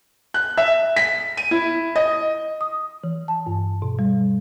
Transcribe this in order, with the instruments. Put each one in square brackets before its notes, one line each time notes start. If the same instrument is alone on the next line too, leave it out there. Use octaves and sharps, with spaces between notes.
[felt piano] F#6
E5
B6
D#7
E4
D#5
[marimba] D#6
E3
A5
G2
B2
G3